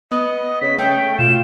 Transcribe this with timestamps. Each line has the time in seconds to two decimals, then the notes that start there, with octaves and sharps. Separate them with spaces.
0.12 B3 D#5
0.61 C#3 B6
0.78 A3 C#4 G5
1.19 B2 F4 E7